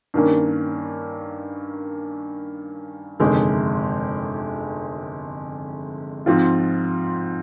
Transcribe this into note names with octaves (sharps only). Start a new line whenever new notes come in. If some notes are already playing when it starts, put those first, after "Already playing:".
G2 D#3 A#3 C#4
G1 F2 C3 D#3 G#3
G#2 F3 C4 F4